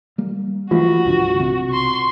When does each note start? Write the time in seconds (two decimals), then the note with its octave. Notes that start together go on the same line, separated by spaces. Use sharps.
0.18 G3 A#3
0.71 E3 F3 A3 F4 F#4 F#5
1.05 C2 G2 D3
1.40 B1 C3
1.68 C6 C#6